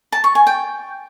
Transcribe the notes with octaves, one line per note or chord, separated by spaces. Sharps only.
A5
C#6
G#5
G5